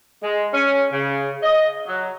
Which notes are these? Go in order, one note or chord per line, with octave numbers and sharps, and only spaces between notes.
G#3
C#4
C#3
D#5
F#3